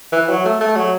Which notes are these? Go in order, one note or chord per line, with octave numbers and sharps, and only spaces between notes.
E3
F#3
A3
A3
F#3